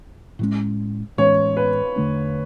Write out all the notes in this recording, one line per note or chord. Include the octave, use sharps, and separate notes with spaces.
A2 E3 G#3 C#4
A2 E3 G#3 C#4 C#5
B4
E2 D3 A3 D4